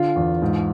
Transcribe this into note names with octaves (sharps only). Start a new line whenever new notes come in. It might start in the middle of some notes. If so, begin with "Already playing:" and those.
Already playing: D3 F4
E2
G#2